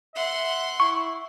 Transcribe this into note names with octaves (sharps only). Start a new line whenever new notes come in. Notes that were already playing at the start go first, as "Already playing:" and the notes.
E5 F#5 C6
E4 C#6